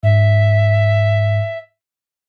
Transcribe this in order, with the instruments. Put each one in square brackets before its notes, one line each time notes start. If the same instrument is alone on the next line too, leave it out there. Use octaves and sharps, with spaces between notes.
[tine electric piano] G#2 [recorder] E5